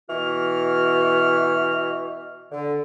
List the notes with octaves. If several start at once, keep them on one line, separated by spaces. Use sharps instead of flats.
B2 E3 F#4 F6
D3